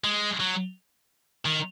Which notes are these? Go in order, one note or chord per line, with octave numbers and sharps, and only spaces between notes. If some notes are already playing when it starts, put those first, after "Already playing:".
G#3
F#3
D#3